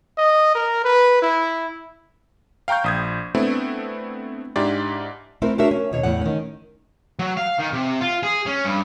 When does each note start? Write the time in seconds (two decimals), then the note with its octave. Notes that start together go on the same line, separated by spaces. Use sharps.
0.17 D#5
0.55 A#4
0.84 B4
1.22 E4
2.68 F5 G5 A#5 C#6 G6
2.84 A#1 D#6 G#6
3.35 A3 B3 C4 D4 E4
4.56 G#2 D4 E4 G4 D5
5.42 A3 C4 E4 A#4 B4
5.58 D4 F#4 A#4 C#5 E5
5.71 C#4
5.92 D#2 B2 C#5
6.03 E2 A2 C#3 F#5
6.21 D#3 C#4
7.19 F#3
7.37 F5
7.59 D#3
7.73 C3
8.01 F4
8.23 G#4
8.46 C#4
8.65 G2